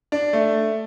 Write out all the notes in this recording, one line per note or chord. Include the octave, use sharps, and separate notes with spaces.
D4
A3